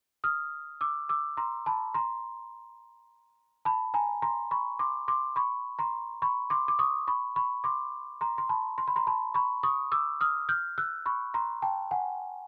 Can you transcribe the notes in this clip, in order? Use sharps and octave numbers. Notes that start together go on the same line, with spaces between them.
D#6 F6
D6 E6
D6 E6
A#5 C6
A5 B5
A#5 C6
A5 B5
G#5 A#5
A#5 C6
B5 C#6
C6 D6
C6 D6
B5 C#6
A#5 C6
B5 C#6
C6 D6
D6
C#6 D#6
B5 C#6
B5 C#6
C6 D6
A#5 C6
C6
A5 B5
C6
B5
A#5 C6
A5 B5
B5 C#6
C#6 D#6
D6 E6
D#6 F6
F6 G6
E6 F#6
B5 C#6
A#5 C6
G5 A5
F#5 G#5